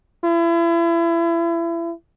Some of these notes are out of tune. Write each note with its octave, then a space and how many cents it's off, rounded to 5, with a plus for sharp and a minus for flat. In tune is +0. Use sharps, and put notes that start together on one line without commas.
E4 +35